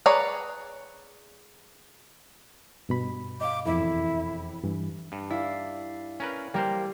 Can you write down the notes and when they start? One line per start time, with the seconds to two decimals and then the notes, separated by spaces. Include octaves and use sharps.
0.06 G#4 B4 C#5 D5 A#5
2.89 G2 B2 B5
3.41 D#5 F5 D6
3.65 F1 E2 E4
4.64 G2 E3
5.12 G2
5.30 E4 D5 F5
6.20 C#4 A#4 B4
6.54 G3 A#3 A#4 C5